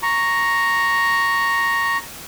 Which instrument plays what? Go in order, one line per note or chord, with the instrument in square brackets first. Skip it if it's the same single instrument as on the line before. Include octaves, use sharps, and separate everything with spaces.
[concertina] A#5 C#6